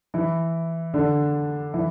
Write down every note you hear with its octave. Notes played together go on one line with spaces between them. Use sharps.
E3 E4
D3 D4
E3 E4